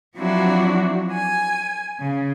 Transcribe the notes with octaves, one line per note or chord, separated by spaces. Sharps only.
F3 F#3 C4 D4 E4 F#4
G#5
C#3